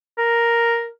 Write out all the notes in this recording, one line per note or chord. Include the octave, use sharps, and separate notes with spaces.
A#4